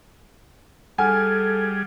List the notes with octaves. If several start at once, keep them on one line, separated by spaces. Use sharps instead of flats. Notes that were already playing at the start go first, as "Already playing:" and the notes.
G3 G#4 A4 F#5 G#5 F6